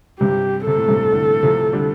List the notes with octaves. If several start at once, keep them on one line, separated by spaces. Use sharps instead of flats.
G2 C3 G4
C3 A4
A2
G2 C3
A2 D3
C3 F3
D3 G3